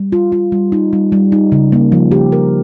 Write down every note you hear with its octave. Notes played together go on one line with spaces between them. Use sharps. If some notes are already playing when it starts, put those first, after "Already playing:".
Already playing: G3
F4
F4
G3
D#4
G3
G3
D#4
C#3
A#3
F3
G4
A#4